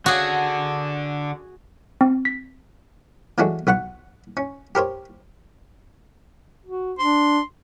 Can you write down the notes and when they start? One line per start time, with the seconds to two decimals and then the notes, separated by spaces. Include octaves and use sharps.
0.06 D3 F#4 G#4
2.01 C4
2.25 B6
3.38 E3 F#3 G#3 A3 D4 F#4
3.67 B1 B3 F#5 C#6
4.37 C#4
4.75 G4 A#4 C5 C#5
6.66 F#4
6.99 D4 C6